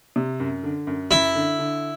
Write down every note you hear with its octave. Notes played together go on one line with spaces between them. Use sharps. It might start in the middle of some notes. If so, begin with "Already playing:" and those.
C3
F#2
D3
F#2
F#2 E4
D3
D3